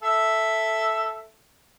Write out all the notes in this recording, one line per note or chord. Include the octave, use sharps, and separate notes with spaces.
A4 E5